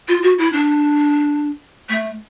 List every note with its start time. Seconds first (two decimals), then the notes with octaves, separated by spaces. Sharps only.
0.08 F4
0.23 F#4
0.38 E4
0.53 D4
1.89 A3